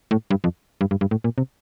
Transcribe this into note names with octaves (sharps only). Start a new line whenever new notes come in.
A2
G2
F2
G2
G2
G2
A2
A#2
C3